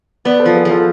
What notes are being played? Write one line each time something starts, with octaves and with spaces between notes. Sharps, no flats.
B3 B4 D5
A4 C5
F3
G#4 B4
F3
F4 A4